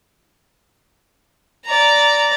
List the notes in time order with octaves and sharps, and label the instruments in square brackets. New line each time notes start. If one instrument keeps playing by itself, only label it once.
[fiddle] D5 A#5